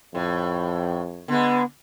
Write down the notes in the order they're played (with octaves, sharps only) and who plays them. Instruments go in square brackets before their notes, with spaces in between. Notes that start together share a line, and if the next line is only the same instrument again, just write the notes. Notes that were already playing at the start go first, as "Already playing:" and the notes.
[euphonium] F2 [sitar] A2
[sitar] D3 G#3 [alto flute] B3